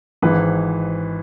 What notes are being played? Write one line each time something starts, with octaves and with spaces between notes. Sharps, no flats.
G#1 G#2 E3 B4